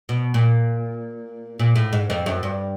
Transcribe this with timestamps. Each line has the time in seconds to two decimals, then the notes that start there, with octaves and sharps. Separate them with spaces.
0.09 B2
0.34 A#2
1.59 A#2
1.76 A2
1.93 G#2
2.10 F2
2.26 F#2
2.43 G2